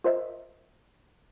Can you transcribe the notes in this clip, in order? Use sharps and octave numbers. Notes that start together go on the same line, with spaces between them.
F4 A#4 C5 D#5 E5